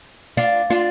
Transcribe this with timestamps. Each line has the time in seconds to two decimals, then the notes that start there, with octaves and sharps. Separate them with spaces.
0.37 D4 F4
0.70 D4 F4